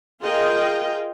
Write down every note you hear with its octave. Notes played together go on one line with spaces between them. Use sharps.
F4 G#4 A#4 D#5 F5 G5